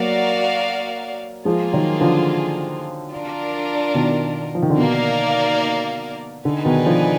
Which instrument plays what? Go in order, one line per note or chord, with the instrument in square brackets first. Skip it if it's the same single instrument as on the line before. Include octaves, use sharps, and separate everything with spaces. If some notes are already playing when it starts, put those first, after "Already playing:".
Already playing: [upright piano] F#3 A#3 [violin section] F#4 A#4 D5 F5
[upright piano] F3 G#3 [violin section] A#3 F4 G#4
[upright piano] D#3 F#3
D3 F3
[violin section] D4 F4 A#4 D5
[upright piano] B2 D#3
F3
D#3
D3
[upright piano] B2 [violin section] A#3 D#4 A#4 D5 F5
[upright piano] D3 [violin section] D#4 G#4 B4 D5 G#5
[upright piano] B2 D#3
D3 F3